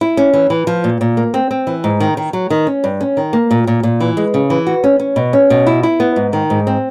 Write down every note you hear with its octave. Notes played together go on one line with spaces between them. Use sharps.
E4
C#4
E3
E3
F3
A#2
A#2
A#3
C4
C4
E3
G#2
D#3
D#3
F#3
D#3
C#4
G2
C#4
D#3
A#3
A#2
A#2
A#2
E3
G#3
C#3
E3
F#4
C#4
C#4
B2
C#4
B2
E4
E4
B3
G#2
D#3
G#2
C4